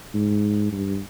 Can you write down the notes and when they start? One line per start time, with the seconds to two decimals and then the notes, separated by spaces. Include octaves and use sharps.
0.14 G#2
0.72 G2